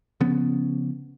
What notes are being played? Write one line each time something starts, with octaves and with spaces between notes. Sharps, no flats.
C#3 F3 B3 C#4